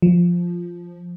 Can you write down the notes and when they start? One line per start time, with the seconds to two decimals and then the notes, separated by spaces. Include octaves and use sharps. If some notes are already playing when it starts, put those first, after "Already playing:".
0.02 F3